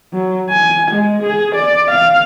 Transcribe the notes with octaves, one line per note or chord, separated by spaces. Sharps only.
F#3
G#5
G#3
G#4
D5
F5